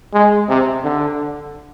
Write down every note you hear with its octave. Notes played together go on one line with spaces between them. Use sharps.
G#3
C3
D3